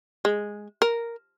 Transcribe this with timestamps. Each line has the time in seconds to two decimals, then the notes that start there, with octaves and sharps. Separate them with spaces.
0.25 G#3
0.82 A#4